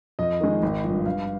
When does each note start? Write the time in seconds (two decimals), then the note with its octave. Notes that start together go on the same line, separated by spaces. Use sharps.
0.19 F2 D#5
0.40 D#3 G#3
0.63 G#1
0.84 G2 F3
1.05 G2 F5